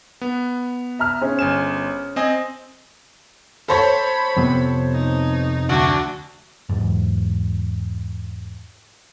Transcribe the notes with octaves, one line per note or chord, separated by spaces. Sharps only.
B3
E5 A#5 F6
C#4 G#4 C5
G1 G#5 E7
C4 D#5 G#5
A4 C5 C#5 B5
F2 C3 B3
D#4
D2 D4 F#4
E2 G#2